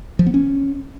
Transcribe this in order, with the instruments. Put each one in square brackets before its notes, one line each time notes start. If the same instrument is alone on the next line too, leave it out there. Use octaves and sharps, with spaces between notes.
[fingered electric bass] F3
B3
C#4